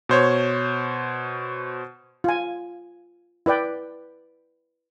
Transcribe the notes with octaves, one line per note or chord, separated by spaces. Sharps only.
B2 C5 C#5
F4 G#5
E4 B4 D5 G5